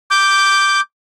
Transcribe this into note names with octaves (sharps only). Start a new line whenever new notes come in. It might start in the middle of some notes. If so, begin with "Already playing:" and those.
D6 G6